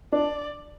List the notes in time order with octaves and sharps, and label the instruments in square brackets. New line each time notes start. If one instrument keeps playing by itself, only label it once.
[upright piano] D4 [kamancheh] D5